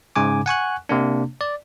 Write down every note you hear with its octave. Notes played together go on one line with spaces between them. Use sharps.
G#2 C#3 G#5 D6
F#5 G#5 C#6 F#6
C3 A#3 D4
D5